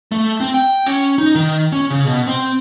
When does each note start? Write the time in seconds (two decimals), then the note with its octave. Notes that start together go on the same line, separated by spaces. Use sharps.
0.12 A3
0.40 C4
0.54 G5
0.86 C#4
1.18 D#4
1.35 D#3
1.72 C#4
1.90 C#3
2.06 B2
2.27 C4